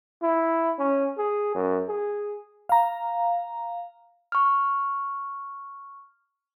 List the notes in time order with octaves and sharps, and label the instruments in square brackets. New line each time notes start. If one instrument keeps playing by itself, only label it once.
[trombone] E4
C#4
G#4
F#2
G#4
[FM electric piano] F5 A#5
[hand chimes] C#6 F6